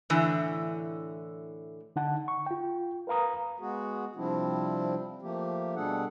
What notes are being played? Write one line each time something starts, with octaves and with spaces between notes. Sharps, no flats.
A2 D3 E3
D3 D#4 F#5 A5
C#6
F4 G5
A#4 B4 F5 A#5 D#6
G#3 B3 F#4 G#4
C3 F3 G3 C4 D4 E4
F3 A3 A#3 G4
B2 G3 D4 G#4 A4 F#5